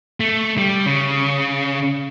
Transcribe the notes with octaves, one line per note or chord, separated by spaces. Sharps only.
A3
G3
C#3